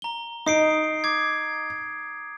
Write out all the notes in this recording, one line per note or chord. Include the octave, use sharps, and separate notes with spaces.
A#5 G7
D#4 D#6 C7 D7
D6 G#6